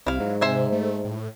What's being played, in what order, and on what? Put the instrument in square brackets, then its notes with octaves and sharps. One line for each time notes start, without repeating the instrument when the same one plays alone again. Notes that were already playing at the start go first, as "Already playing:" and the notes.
[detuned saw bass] C2 [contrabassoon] C3 [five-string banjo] E4 F5
[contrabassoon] G#2 [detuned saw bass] F#3
[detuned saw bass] C3 [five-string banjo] C5 E5 G#5
[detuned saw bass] A3
A2